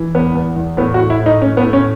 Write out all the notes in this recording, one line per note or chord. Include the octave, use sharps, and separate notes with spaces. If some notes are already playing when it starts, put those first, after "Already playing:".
Already playing: E3
E2 B3
E2
E2
A2 B3
F#4
A2
E4
A2
D#4
A2 C#4
B3
A2
C#4